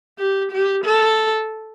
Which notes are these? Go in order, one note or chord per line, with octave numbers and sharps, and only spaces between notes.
G4
G4
A4